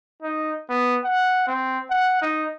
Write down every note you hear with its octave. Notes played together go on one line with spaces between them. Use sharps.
D#4
B3
F#5
C4
F#5
D#4